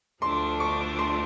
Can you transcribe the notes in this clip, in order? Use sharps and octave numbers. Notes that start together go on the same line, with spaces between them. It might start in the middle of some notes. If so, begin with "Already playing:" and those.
D2 D3 F3 A3 D4 C6
C#6
C6